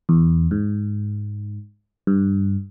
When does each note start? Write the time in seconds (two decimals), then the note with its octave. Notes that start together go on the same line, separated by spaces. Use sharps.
0.09 E2
0.51 G#2
2.07 G2